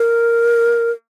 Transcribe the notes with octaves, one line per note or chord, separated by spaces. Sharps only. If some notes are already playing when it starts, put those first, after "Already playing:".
Already playing: A#4